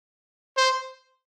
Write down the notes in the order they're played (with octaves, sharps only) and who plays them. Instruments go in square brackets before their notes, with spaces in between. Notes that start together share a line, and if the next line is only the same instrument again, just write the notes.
[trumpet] C5